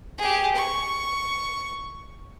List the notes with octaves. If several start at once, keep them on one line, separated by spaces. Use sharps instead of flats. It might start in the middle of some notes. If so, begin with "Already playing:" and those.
G4 G#4
C#6